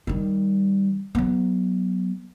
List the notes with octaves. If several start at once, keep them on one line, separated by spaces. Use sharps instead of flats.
D#3 G3
F#3 B3